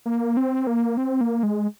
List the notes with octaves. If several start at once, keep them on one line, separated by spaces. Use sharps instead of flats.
A#3
C4
A#3
C4
A#3
G#3